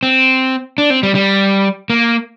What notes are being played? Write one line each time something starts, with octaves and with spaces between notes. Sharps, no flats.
C4
D4
C4
G3
G3
A#3